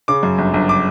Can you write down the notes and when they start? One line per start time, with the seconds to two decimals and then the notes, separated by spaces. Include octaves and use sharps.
0.08 C#3 D6
0.23 F#2
0.38 G1
0.54 G1
0.69 D6